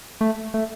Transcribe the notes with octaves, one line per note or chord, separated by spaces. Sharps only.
A3
A3